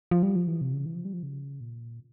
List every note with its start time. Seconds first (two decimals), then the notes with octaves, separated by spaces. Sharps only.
0.11 F3
0.23 G3
0.36 F3
0.48 E3
0.61 C3
0.73 C#3
0.86 E3
0.95 F3
1.05 G3
1.13 F3
1.23 C#3
1.61 A#2